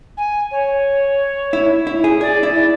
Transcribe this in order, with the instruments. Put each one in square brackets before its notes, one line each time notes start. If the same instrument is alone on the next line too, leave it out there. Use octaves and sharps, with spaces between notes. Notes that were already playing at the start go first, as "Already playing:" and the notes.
[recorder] G#5
C#5
[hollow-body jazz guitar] E4
E4
G#4
[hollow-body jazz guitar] G#4 [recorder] D5
[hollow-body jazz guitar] E4
[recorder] D5